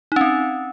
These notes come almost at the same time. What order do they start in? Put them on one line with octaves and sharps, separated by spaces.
D#4 C#4 C4